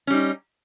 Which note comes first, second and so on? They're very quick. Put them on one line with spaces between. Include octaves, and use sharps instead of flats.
C#4 G3 D#4